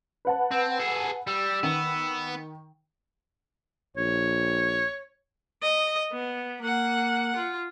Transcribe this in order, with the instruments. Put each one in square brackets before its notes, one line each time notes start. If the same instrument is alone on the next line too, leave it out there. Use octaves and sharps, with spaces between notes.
[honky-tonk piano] B4 F#5 A5
[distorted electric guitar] C4
G#4 A4
[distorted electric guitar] G3 [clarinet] E6
[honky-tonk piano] D#3 [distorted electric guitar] B3
[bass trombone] A#1 [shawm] C#5
[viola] D#5
B3
A#3 F#5
F4